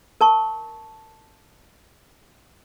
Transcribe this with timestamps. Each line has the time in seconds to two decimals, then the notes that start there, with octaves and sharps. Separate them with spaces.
0.21 A#4 A5 C#6